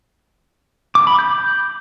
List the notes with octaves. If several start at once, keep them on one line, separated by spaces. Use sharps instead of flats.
D6
B5
G6